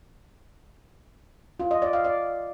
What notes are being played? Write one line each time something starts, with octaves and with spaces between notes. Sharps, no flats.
F4
D#5
D5
F5
D5